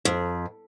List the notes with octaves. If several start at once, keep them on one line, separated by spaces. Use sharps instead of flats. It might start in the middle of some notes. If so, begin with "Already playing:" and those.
F2